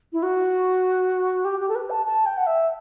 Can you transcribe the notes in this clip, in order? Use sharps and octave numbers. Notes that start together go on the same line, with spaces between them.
E4
F#4
G4
G4
A4
B4
A5
A5
G5
F#5
E5